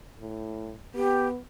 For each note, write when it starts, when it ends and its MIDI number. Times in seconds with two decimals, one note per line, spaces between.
0.20 0.75 45
0.95 1.39 59
0.95 1.27 67